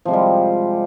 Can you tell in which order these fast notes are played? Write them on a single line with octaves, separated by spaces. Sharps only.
F3 C3 G#3 G3